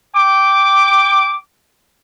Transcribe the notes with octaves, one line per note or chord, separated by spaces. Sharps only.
G5 D6